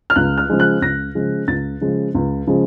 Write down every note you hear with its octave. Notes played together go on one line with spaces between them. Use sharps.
F6
C#2 F#6
F6
C#3 F3 G#3
F#6
C#2 A#6
C#3 F3 G#3
C#2 A6
C#3 F3 G#3
C#2
C#3 F3 G#3